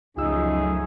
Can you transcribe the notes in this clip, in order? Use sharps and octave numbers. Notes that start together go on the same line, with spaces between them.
C#2 F#2 F3 A3 D#4 F4 G#4 E6